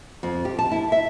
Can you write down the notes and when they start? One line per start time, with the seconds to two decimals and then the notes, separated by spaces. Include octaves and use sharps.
0.23 F2
0.45 G4
0.59 A5
0.71 E4
0.92 E5